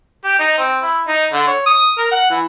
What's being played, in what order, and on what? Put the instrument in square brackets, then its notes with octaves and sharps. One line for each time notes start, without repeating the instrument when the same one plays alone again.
[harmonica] G4
D#4
C4
E4
D#4
D3
C#5
D#6
A#4
F#5
E3